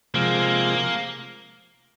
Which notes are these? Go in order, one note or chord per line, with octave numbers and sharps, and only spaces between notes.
C3 F3 G#3 A#3